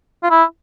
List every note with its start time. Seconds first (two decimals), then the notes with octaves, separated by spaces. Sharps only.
0.23 F4
0.30 E4